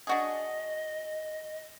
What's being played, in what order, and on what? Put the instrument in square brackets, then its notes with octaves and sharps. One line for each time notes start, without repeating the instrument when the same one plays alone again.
[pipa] D4 F#4 G#4 [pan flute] D#5